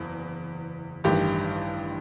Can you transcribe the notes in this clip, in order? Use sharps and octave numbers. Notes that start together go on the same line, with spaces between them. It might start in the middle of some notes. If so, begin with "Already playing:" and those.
Already playing: F#1 E2
A1 G2 D#3 G4